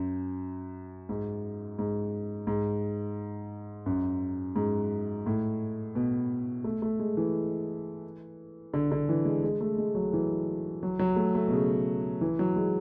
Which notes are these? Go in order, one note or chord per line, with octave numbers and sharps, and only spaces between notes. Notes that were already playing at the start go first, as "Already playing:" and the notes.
Already playing: F#2
G#2
G#2
G#2
F#2
G#2
A2
B2
A3
A3
G#3
E3
D3
D3
E3
G#3
G#3
A3
G#3
F#3
E3
F#3
F#3
A3
A3
B2
C#3
E3
F#3
G#3